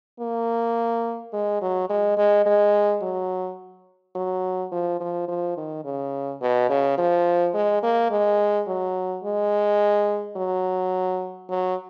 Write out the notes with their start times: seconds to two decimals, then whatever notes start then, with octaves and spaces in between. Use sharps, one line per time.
0.20 A#3
1.33 G#3
1.62 F#3
1.89 G#3
2.17 G#3
2.46 G#3
3.02 F#3
4.15 F#3
4.72 F3
5.00 F3
5.28 F3
5.57 D#3
5.85 C#3
6.42 B2
6.70 C#3
6.98 F3
7.54 G#3
7.83 A#3
8.11 G#3
8.67 F#3
9.24 G#3
10.37 F#3
11.50 F#3